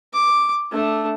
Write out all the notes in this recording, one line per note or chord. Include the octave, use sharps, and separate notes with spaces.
D6
A3 D4